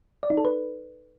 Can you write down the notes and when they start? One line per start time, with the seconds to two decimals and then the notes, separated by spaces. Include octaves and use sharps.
0.23 D5
0.30 D#4
0.37 A4
0.45 B4